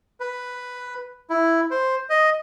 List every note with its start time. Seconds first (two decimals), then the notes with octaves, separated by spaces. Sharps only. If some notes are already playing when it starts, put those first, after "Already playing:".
0.20 B4
1.30 E4
1.71 C5
2.10 D#5